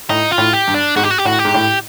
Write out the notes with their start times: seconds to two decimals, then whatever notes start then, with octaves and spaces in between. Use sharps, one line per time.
0.09 A2 D#4
0.31 F4
0.38 A2
0.53 G4
0.68 G2
0.74 D4
0.96 G#2 F#4
1.03 G4
1.11 F#4
1.18 G4
1.25 A2 F#4
1.39 G4
1.45 G#2
1.54 A2